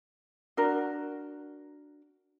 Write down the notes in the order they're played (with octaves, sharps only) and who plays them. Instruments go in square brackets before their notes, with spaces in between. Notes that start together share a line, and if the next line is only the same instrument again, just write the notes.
[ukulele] D4 F#4 A#4